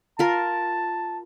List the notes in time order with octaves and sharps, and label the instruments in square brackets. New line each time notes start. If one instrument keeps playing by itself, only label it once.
[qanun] F4 A#4 [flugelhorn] A5